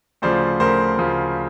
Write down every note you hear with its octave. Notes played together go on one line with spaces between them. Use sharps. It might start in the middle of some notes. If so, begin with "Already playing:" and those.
D2 C#3 F3 C5 D5
D2 C#3 F3 A#4 C5
D2 C#3 F3